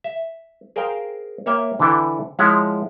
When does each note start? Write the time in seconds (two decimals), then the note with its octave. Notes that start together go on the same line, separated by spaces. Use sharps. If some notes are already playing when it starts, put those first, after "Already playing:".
0.04 E5
0.76 G#4 A#4 C5 F5 G5
1.46 A#3 C#5 E5 G5
1.79 D3 E3 D4 E4 A4 G5
2.39 F3 G#3 E4 C#5 F#5